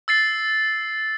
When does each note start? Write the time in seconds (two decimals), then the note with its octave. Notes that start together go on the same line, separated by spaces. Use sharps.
0.08 E6 A6 C7